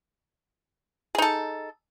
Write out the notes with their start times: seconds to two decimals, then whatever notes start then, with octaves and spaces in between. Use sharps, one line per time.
1.15 G#4
1.18 D#4
1.22 A4